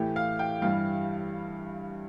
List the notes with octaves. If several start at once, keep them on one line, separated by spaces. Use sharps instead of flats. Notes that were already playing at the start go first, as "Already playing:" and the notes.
Already playing: A2 E3 A3 G4
F5
G5
G2 E3 G3 F5